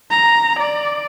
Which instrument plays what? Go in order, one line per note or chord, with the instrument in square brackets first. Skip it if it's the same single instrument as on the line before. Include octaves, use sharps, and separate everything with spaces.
[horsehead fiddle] A#5
D5